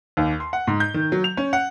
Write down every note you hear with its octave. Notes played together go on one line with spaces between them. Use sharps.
D#2
C6
F#5
G#2
G6
D#3
F#3
F7
C#4
F#5